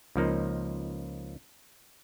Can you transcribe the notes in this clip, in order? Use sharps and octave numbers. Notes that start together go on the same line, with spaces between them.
C#2 F3 A#3 D#4